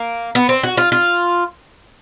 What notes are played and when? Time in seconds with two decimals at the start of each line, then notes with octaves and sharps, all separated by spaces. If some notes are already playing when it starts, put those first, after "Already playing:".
Already playing: A#3
0.35 B3
0.49 C4
0.63 F#4
0.77 F4
0.92 F4